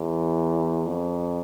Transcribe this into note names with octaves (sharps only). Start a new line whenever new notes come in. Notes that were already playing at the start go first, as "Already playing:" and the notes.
Already playing: E2
F2